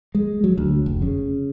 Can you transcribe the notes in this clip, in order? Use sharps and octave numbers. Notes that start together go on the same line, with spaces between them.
G#3
F#3
D2
F1
C#3